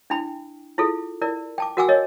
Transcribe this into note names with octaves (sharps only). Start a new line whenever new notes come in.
D4 E4 G5 B5
E4 F4 G#4 A4
E4 A#4 D5
G5 A5 D6
F#4 A#4 F#5 G#5 D6 E6
A#4 C#5 D#5